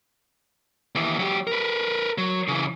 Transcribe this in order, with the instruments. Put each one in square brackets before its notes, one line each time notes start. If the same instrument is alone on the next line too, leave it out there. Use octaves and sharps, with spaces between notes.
[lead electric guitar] D#2 E3
F#3 G4
A#4 B4
F#3
C#3 E3